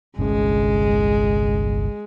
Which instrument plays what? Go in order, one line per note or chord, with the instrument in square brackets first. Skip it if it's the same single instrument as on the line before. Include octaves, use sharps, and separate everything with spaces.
[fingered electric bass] G1 C2 C#4 [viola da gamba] G#3